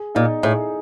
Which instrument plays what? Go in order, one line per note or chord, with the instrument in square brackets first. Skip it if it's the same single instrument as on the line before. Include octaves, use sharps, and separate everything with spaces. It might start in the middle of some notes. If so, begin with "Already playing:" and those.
Already playing: [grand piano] G#4
[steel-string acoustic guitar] A#2 [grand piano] D#4
[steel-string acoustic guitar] A2 [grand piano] G#4